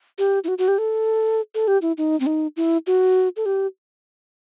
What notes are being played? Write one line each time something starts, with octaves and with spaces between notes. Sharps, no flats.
G4
E4
F#4
F#4
G4
A4
A4
G4
E4
D#4
C4
D#4
E4
F#4
A4
G4